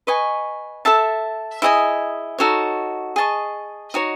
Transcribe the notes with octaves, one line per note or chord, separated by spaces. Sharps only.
B4 D#5 G#5 C#6
A4 E5 A5
E4 G#4 D#5 G#5
D#4 F#4 A4 C#5
G#4 D#5 A5 C#6
D#4 F#4 C#5